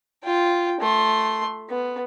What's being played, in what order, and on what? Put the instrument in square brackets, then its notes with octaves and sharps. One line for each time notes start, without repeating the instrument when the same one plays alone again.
[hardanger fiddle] F4 G5
A3 C6
B3